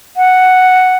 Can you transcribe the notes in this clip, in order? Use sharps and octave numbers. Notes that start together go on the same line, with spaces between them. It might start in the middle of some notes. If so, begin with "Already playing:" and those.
F#5